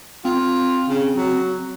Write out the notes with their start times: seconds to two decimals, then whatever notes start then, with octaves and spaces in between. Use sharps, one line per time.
0.25 C4 F4
0.89 C#3
1.17 F#3